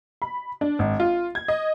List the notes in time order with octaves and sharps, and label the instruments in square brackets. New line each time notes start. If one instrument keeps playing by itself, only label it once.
[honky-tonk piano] B5
D4
G#1
F4
G#6
D#5